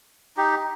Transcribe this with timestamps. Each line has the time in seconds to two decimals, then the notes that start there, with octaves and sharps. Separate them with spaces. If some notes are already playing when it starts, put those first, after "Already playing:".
0.37 D#4 G4